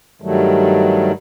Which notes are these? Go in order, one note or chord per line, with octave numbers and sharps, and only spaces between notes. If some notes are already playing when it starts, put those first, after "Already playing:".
G2 D#3 F#3 G3 A3